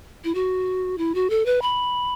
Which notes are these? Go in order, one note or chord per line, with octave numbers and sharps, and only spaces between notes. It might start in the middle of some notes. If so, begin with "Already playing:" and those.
E4
F#4
E4
F#4
A4
B4
B5